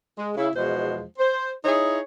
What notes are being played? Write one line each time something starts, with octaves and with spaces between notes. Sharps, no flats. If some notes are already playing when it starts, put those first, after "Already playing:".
G#3
C#3 E4
E2 B2 F3 G#3 C5
C5
D#4 E4 G#4 C#5